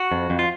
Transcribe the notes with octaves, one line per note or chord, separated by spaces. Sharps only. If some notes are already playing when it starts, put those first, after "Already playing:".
Already playing: F#4
F2
F2
F4